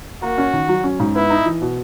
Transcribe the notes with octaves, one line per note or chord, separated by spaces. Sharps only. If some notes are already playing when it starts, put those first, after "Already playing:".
A#3 F#4
C#4
D#3
F#3
C#4
G#2
B3 E4
D#4
E3
B2